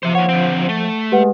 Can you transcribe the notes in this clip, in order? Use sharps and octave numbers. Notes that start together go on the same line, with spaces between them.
F3 C5 E5
D#2 C#5 F#5
D3 C4
A3
G#3 G4 B4 F#5